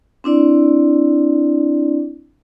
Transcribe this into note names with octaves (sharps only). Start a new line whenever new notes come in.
C4 D4 E4 D5